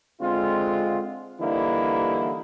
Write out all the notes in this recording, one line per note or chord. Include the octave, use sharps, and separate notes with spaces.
D3 G#3 C4 F4
D3 E3 G3 A#3 D#4 E4